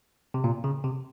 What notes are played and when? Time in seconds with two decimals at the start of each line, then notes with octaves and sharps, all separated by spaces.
0.34 C3
0.44 A#2
0.64 C#3
0.84 C3